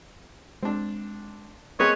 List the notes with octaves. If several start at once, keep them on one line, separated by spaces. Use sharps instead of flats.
G#3 C4 D4
A#3 C4 G#4 B4 C#5 D#5